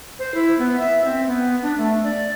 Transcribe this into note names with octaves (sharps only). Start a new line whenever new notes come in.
C5
E4
B3
E5
C4
B3
D4
A3
D5